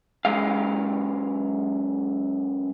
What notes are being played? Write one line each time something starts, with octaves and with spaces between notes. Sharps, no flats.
F#2 G#3 F5